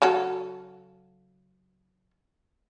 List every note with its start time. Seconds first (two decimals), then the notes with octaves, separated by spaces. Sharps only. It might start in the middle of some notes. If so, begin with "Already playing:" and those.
0.02 C#3 F#3 A4